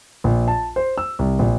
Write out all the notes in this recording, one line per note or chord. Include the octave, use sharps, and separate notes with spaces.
A#1
A5
C5
E6
C2
A#1